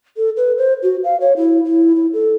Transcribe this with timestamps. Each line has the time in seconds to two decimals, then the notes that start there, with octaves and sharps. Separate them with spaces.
0.17 A4
0.37 B4
0.58 C5
0.82 F#4
1.04 F5
1.20 C#5
1.37 E4
1.65 E4
1.96 E4
2.13 A4